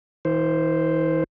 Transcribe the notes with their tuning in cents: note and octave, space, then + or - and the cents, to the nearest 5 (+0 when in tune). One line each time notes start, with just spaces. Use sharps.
E3 -45 C5 +0